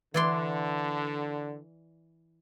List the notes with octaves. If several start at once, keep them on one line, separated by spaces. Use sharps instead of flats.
D3 E3 D5 C6